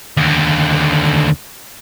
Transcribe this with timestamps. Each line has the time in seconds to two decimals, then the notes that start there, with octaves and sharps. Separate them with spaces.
0.17 D#2 D3